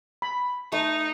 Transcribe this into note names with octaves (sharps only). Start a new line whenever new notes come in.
B5
A3 D#4